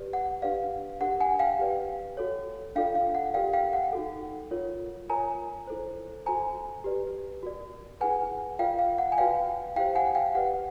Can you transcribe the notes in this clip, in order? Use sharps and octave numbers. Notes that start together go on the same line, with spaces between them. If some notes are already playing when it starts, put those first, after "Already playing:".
Already playing: G4 B4 D5
F#5
D4 G4 B4 D5 F5
D4 G4 A#4 F#5
F#5 G#5
F5 G5
G4 B4 D5
F#4 A4 C#5
D4 F4 A4 D5 F5 G5
F5
F#5
G4 A#4 D5 F5 G5
F5 G5
F#5
D#4 F#4 A4
F4 A#4 C#5
F4 A#4 C#5 G#5 A#5
E4 A4 C5
F#4 A4 C5 G#5 A#5
G4 B4 D5
F#4 A#4 D5
E4 G#4 B4 F#5 G#5
F4 A#4 D5 F5 G5
F5
F#5
G#5
F#4 B4 D5 F5 G5
E4 G4 C5 F5 G5
F#5 G#5
F5 G5
G4 B4 D5 F#5